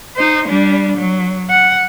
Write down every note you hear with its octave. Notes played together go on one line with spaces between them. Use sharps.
D#4 C5
G3 D4
F#3
F#5